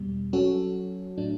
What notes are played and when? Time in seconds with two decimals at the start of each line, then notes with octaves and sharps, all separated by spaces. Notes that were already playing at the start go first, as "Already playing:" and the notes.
Already playing: E2 B2 G3
0.33 F#3 C#4 F#4 A4
1.17 A2 F#3 A3 D4